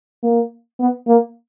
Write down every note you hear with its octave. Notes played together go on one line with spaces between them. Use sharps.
A#3
B3
A#3